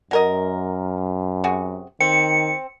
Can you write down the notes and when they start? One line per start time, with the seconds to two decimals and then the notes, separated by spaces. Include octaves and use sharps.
0.11 F#2 F#3 A#4 D#5
1.44 C3 F#4 G#4
2.00 D#3 C4 C#7